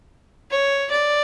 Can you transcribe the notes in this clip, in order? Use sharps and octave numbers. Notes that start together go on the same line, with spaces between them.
C#5
D5